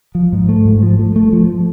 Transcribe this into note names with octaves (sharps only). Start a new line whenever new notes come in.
F3
G#2
A3
G#2
F3
A3
A3
F3